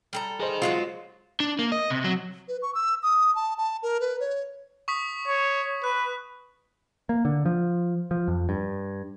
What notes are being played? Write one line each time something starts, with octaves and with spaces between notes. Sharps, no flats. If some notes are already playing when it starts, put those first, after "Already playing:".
G3 A4 A#5
G#4 A#4 C5 D#5
F#3 G#3 F4 F#4
D4
A#3
D#5
C3
F#3
B4
C#6
E6
D#6
A5
A5
A#4
B4
C#5
C#6 D#6 B6
C#5
B4 F#6
A#3
D3
F3
F3
F2
G2